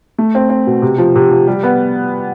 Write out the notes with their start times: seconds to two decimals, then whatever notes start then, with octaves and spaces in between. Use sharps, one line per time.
0.18 A3
0.35 C4
0.50 C4
0.67 B2
0.82 C3
0.98 F3
1.16 C3
1.31 F3
1.47 G3
1.63 B3